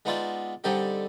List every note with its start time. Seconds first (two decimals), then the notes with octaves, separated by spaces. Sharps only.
0.05 G#3 B3 D#4 F4 D5 E5
0.64 D3 G3 C4 D#4 G4 A4